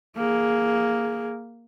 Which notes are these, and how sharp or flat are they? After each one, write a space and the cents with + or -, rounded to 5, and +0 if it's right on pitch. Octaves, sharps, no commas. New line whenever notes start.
A#3 +0 G#4 +0